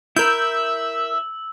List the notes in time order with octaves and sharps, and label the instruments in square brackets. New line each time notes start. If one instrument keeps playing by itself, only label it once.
[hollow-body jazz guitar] E4 A#4 [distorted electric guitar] E5 [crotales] E6 [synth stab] G6